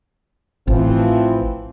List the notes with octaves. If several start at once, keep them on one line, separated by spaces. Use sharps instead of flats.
A1 E3 F3 C4